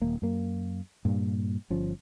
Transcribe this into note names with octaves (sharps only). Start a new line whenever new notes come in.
D#1 A#3
F#2 A#3
G2 A#2
G1 F3 C#4